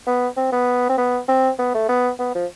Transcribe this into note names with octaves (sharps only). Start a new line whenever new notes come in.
B3
C4
B3
C4
B3
C4
B3
A3
B3
B3
F3